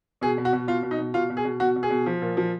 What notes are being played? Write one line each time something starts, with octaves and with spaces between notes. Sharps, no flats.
B2 G#4
B2
F#4
B2
B2 F4
B2
D#4
B2
B2 F4
B2
G#4
B2
B2 F#4
B2
G#4
B2
F3
A#2
F3